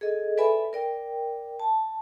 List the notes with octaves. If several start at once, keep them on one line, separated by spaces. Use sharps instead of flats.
G#4 A4 D#5
A4 B4 D5 E5 G#5 B5
A#4 D5 G5
A5